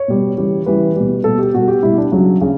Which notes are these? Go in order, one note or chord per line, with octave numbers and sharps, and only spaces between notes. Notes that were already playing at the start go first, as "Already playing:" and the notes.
Already playing: C#5
B2 G3
C#3 E3 G3
C#3 E3 G3 B4
B2 G3
B2 G3 A4
G4
B2 G3 F#4
G4
B2 G3 E4
D4
C#3 F#3
C#3